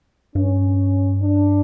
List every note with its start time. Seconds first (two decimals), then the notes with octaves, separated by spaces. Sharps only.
0.35 G2 C#4
1.22 D4